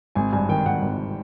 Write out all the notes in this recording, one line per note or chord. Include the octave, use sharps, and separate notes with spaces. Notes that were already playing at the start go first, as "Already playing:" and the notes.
G#1 G#5
G2 G#5
D#3 G5
G#1 F#5
G#1